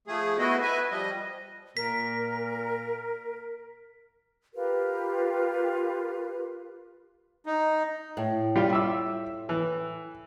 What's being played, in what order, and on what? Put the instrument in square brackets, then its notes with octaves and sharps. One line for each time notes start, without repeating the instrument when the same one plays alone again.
[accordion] F3 A3 G#4
A3 B3 E4 F#4 D#5
B4 E5 G#5
F3 G3 D#5
[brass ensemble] A#2 [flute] A#4 [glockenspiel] B6
[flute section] F4 G4 A#4 B4
[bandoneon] D#4
[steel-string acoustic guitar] A2
[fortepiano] G3 F4
E5 D6 E6
E3